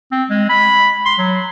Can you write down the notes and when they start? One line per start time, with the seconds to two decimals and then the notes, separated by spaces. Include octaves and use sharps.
0.12 C4
0.30 G#3
0.50 B5
1.06 C6
1.19 F#3